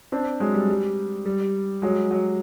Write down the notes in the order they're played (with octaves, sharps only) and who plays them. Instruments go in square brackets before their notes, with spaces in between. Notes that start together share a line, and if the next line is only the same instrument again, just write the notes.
[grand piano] C4 D4
F#3 G#3
G3
G3
G3
F#3 G#3
F#3